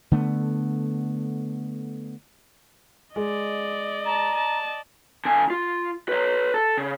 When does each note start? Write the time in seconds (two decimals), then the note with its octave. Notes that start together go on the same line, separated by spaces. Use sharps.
0.12 D3 A3 B3
3.16 G#3 D5 D#5
4.06 A5 A#5
4.35 A5
5.25 D3 G#5
5.50 F4
6.09 B4 C#5
6.54 A4
6.77 C#3